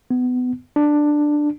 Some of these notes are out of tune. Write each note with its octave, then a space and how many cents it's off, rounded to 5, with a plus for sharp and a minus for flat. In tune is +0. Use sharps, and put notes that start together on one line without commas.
B3 +20
D4 +10